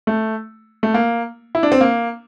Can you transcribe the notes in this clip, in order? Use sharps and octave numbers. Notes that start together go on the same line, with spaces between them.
A3
A3
A#3
E4
D4
C4
A#3